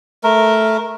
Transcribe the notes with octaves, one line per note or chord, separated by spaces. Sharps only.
A3 A#4